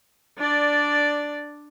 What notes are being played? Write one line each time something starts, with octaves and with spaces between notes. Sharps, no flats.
D4 D5